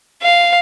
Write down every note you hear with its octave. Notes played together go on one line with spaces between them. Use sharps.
F5